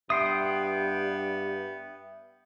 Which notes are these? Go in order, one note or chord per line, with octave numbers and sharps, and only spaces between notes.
G2 B3 E5 G5 C6 D#6